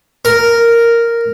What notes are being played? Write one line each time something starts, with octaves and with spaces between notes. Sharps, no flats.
A#4